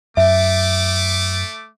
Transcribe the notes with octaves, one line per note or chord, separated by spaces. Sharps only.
F#2 A3 E5 D6